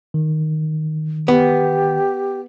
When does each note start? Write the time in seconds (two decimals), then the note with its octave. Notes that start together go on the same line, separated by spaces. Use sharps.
0.14 D#3
1.28 B3 G4